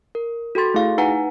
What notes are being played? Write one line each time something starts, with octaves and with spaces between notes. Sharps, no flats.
A#4
F#4 A4 G5 C6 A6
A3 E4 F#4 G#4 F5
D#4 B4 F#5 G#5 A#5